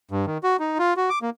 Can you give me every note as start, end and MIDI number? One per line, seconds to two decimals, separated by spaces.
0.11 0.25 43
0.26 0.38 51
0.43 0.57 66
0.60 0.78 63
0.79 0.94 65
0.97 1.10 66
1.10 1.19 86
1.22 1.30 58